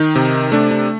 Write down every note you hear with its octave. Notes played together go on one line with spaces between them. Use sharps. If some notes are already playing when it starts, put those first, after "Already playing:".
Already playing: D#3 D#4
C3
A3 D4
D4